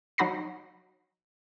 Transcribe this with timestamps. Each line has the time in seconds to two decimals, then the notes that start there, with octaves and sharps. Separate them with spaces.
0.18 F#3 D#4 F#4 B5 A#6 C7